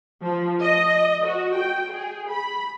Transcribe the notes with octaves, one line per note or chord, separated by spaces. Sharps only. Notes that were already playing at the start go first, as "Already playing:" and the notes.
F3
D#5
F#4
G5
G#4
B5